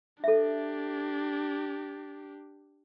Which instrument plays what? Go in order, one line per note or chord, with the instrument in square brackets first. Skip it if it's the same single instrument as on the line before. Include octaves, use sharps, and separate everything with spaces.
[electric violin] D4 G4 [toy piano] A4 E5